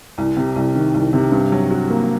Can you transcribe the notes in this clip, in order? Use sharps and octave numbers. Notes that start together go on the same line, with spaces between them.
C2
C3
C2
D#3
C2
C3
G2
F#3
F#4
A#3